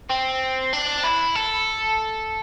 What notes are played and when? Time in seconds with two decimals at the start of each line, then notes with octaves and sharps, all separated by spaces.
0.10 C4
0.73 D4
1.03 E4
1.35 A4